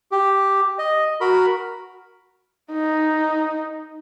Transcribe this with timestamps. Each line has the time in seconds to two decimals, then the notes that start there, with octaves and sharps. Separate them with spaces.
0.12 G4
0.79 D#5
1.21 F#4 A#4 B5
2.71 D#4